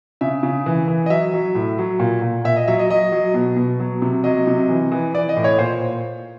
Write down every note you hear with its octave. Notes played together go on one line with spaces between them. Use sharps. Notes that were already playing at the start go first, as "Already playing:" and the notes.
C#3 E5
C#3
E3
E3
D#5
F#3 E5
F#3
A2
F#3
A#2
A#2
A#2 E5
D#5
F#3 E5
D#5
F#3 D#5
F#3
B2
B2
F#3
C3
F#3 D#5
C3
E3
E3
E3 D5
D#5
A2
C#5
A#2 C5